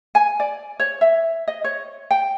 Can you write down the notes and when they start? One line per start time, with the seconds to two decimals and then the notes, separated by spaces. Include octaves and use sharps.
0.15 G#5
0.40 D5
0.79 C#5
1.01 E5
1.48 D#5
1.64 C#5
2.11 G5